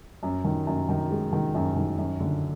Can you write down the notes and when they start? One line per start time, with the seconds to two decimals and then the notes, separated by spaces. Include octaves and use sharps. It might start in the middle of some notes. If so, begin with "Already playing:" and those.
0.23 F#2
0.44 D#3
0.67 F#2
0.89 D#3
1.10 G#3
1.33 D#3
1.55 F#2
1.76 D#3
1.98 F#2
2.20 D3